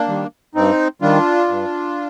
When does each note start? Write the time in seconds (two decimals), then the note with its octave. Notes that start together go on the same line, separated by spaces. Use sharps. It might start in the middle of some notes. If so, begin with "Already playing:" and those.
Already playing: A#3 D4
0.08 D#3 G3
0.55 G2 C4 D#4
1.02 D#3 G3 D4 F4
1.48 G2